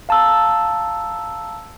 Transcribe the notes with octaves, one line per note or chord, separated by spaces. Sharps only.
F5 A5 A#5 E6